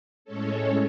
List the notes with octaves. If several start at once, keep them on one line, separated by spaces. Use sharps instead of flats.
A2 G#3 C#4 A4 C#5